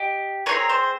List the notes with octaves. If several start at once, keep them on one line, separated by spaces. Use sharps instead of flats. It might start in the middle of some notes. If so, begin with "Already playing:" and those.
Already playing: G4 D#5
C4 D#4 G#4 A#4 C#5
C5